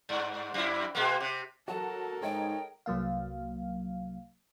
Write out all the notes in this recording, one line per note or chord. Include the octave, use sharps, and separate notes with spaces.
G2
F#2 E4
B2 G#3 A#3
C3
F#3 F#4 A4 A#4 A5
G#2 D#4 G#4 C#5 D#5 G5
C2 F#3 A#3 F5